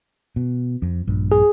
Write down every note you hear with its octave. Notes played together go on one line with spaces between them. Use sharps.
B2
F2
A#1 G2
G#4